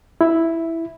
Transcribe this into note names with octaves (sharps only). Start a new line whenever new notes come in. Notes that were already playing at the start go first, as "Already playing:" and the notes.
E4